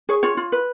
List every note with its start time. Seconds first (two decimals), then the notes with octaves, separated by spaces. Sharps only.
0.09 G#4 C#5
0.23 F4 C#5
0.37 F4
0.52 B4